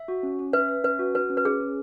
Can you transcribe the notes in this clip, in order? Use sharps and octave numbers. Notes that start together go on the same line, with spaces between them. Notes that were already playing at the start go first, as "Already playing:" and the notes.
Already playing: E5
F#4
C#4
C#4
B4 E5
E5
C#4 B4
F#4
F#4 B4
C#4
B4
C#4 G#4
C#4